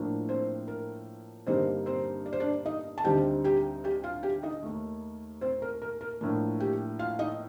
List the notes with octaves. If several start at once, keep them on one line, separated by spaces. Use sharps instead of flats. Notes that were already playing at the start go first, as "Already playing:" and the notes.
Already playing: A2 F3 A#3 D4
C4 C5
A#4
G2 D3 G3 A#3 C4 D#4 C5
C4 C5
D5
C5
D4 D5
D#4 D#5
A5
D2 D3 G3 C4 D#4 G4 G5
G4 G5
G4 G5
F4 F5
G4 G5
D#4 D#5
D#2 D#3 A3
C4 C5
A#4
A#4
A#4
A2 F3 A#3 D4
G4 G5
F4 F5
D#4 D#5